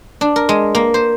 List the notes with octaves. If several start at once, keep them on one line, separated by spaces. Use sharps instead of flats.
D4
A#4
G#3
A#3
C5